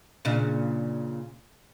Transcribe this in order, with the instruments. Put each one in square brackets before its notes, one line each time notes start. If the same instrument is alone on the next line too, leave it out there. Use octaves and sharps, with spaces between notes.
[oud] A#2 C#3 D4